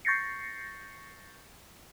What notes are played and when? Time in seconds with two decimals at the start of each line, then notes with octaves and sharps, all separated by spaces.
0.05 C#6 G6 A6 A#6 C7 C#7